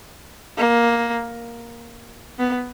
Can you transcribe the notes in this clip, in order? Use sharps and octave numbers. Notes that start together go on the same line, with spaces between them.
A#3
B3